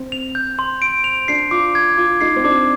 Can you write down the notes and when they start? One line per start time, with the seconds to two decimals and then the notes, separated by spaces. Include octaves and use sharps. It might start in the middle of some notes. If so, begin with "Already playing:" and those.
Already playing: C4
0.12 F7
0.35 G6
0.59 C6
0.82 D7
1.04 F7
1.28 D4 C7
1.51 F4 D6
1.75 G#6
1.98 F4 D6
2.21 D#4 C7
2.36 C4
2.44 D4 D6